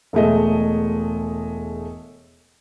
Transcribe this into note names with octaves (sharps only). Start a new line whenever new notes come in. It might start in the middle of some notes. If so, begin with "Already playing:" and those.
E1 G#3 A3 D#5